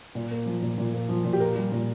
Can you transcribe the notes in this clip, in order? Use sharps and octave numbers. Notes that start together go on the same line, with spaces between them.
A#2
A#3
F3
A#2
A#2
A#3
F3
A#2
G4
A#3 A#4
G3
A#2